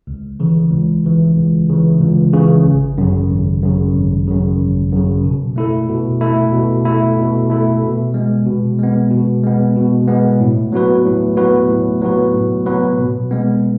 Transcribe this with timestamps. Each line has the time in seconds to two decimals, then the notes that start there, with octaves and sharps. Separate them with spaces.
0.07 C#2
0.40 C#3 E3
0.71 C#2
1.04 C#3 E3
1.37 C#2
1.69 C#3 E3
2.00 C#2
2.33 C#3 E3
2.65 G#1
2.98 F#2 C#3
3.30 G#1
3.62 F#2 C#3
3.94 G#1
4.27 F#2 C#3
4.59 G#1
4.92 F#2 C#3
5.24 B2
5.56 A3 E4 A4
5.89 B2
6.21 A3 E4 A4
6.53 B2
6.85 A3 E4 A4
7.18 B2
7.50 A3 E4 A4
7.82 B2
8.14 G#3 B3
8.46 B2
8.79 G#3 B3
9.11 B2
9.43 G#3 B3
9.76 B2
10.08 G#3 B3
10.40 A2
10.72 F#3 B3 F#4 B4
11.05 A2
11.37 F#3 B3 F#4 B4
11.69 A2
12.01 F#3 B3 F#4 B4
12.33 A2
12.66 F#3 B3 F#4 B4
12.98 B2
13.31 G#3 B3